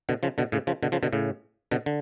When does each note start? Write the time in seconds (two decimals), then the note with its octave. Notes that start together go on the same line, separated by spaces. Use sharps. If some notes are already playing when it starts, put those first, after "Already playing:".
0.09 B2 D3
0.23 C#3 F3
0.38 B2 D3
0.52 A2 C#3
0.67 C#3 F3
0.83 B2 D3
0.92 C#3 F3
1.03 B2 D3
1.13 A2 C#3
1.71 B2 D3
1.86 D3